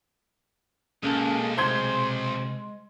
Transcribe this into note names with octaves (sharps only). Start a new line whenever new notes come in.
B1 G#3 A#3 C#4 A4
C3 G#3 C5 C6 G#6